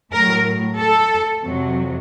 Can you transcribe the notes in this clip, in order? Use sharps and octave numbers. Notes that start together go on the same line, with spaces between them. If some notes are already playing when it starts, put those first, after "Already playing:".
A2 F#3 A#4
A4
F2 C3 F#3